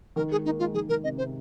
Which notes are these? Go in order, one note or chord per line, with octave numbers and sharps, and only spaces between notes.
D#3 A#4
G#3 G#4
A#3 D#4
G#3 F4
D#3 G#4
D#3 A#4
C3 D#5
C3 C5